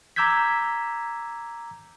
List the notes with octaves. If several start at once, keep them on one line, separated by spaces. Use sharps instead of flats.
A#5 D6 E6 G6 G#6 B6